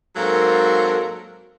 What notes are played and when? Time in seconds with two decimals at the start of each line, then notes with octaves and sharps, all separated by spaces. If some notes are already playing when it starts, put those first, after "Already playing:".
0.16 G#2 F#3 A#3 C4 A4 A#4